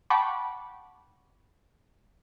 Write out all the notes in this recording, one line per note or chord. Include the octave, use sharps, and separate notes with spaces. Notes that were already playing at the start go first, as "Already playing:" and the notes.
F#5 G5 A5 B5 C#6 D6